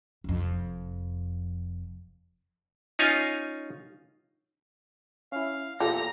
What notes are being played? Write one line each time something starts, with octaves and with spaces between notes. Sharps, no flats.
F1 F2
C#4 D#4 F4 F5 G#5
C#4 E4 F5
E2 A#2 F4 G4 A4 A#5 A#6